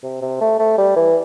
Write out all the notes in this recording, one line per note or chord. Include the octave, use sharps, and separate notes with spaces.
C3
C3
A3
A3
G3
E3